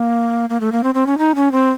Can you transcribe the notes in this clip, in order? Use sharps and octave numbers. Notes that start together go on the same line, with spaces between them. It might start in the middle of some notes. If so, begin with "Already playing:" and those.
Already playing: A#3
A#3
A3
A#3
C4
C4
C#4
D#4
C#4
C4